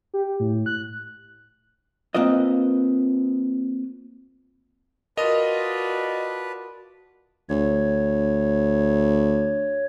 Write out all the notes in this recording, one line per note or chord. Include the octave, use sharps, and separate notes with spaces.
G4
A2
F#6
A#3 C4 F4 B4 D#5
F4 F#4 A#4 B4 D5 D#5 A5 D#6
D2 C#5